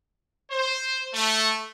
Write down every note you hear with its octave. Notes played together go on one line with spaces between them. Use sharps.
C5
A3